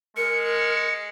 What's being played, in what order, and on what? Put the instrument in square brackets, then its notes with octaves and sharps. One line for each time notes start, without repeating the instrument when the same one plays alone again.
[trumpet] G#3 [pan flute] A#4 [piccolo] C#7